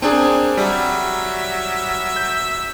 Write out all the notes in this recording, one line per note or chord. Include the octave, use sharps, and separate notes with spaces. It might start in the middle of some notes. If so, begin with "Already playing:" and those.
C4 D4 G#4 A#4 G#5
F#3 G3 E5
G6